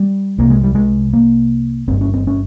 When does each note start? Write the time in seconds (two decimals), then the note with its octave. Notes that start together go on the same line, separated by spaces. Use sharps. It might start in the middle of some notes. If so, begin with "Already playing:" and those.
Already playing: G3
0.38 C2 C3 A#3
0.50 G#3
0.64 G3
0.75 G#3
1.13 A#3
1.88 G1 G2 C4
2.01 C#4
2.14 C4
2.27 C#4